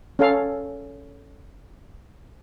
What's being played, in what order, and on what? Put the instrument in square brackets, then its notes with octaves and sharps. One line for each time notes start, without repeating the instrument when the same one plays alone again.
[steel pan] C#4 A4 F5